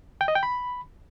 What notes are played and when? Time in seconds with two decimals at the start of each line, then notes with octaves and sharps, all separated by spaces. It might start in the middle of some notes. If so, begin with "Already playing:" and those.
0.21 G5
0.28 D#5
0.35 G5
0.43 B5